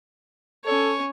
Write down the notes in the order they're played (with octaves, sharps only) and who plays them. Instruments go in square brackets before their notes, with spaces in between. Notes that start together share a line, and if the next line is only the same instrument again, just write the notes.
[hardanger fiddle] C#4 C#5 [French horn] A4